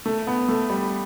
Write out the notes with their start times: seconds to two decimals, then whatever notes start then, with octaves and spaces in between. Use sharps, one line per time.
0.06 A3
0.27 B3
0.48 A3
0.70 G3